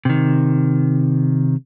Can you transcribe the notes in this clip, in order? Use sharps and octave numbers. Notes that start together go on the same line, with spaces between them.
C3 D#3